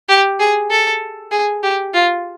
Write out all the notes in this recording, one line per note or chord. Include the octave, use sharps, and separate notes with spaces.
G4
G#4
A4
G#4
G4
F4